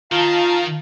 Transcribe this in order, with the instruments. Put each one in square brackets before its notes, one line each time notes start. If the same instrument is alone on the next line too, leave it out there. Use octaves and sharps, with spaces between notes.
[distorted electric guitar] D#3 [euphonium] F4 [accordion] F5 A5 A#5